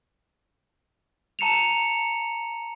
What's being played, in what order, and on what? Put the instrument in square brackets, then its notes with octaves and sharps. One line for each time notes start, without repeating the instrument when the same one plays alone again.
[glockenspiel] A5 A#5 C#7 E7 F7